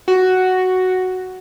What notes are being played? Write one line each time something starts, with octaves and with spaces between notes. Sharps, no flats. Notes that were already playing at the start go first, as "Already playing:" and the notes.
F#4